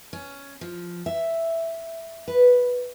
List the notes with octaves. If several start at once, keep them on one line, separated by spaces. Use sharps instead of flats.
C#4
F3
E5
B4